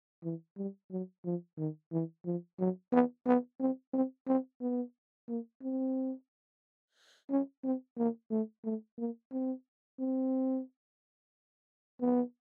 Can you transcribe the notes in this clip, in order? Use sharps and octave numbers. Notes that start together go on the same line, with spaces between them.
E3
G3
F#3
F3
D#3
E3
F3
F#3
B3
B3
C4
C4
C4
B3
A#3
C4
C#4
C4
A#3
A3
A3
A#3
C4
C4
B3